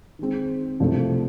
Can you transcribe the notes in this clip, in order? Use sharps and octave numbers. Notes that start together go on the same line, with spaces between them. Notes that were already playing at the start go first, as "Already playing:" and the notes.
D#3 G#3 C4
C2 C3 F3 A3 D4